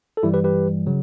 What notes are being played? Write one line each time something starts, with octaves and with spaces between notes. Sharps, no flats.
A4
G2 E3 G3 E4 G4
G4 B4
G4 B4
C#3 F#3